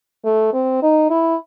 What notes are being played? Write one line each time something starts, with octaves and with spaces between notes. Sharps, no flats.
A3
C4
D#4
E4